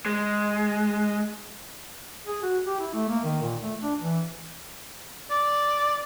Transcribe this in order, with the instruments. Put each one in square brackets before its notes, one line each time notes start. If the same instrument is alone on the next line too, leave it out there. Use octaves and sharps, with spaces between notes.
[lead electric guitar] G#3
[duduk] G#4
F#4
G4
E4
A3
A#3
D#3
A#2
A3
D4
E3
[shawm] D5